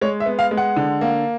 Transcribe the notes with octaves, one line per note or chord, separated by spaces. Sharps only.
G#3 C#5
E5
B3
F5
G#3
F#5
D3
A#3